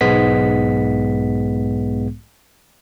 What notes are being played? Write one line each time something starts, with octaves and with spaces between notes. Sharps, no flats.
B1 G#2 G#3 B3 B6